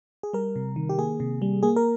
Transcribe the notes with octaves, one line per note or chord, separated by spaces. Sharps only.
G#4
G3 A#4
C3
D#3
G4
A#3 G#4
C3
G3
A#3 G#4
A#4